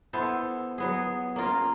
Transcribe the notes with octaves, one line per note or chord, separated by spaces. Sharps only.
B3 E4 A4 C5
F#3 B3 G#4
A#3 C#4 F4 A#4